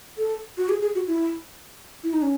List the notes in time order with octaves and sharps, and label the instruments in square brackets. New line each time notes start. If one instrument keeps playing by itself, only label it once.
[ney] A4
F#4
G#4
G#4
F#4
E4
E4
D#4
C#4